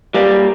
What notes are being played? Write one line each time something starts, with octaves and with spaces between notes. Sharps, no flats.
G3 A#3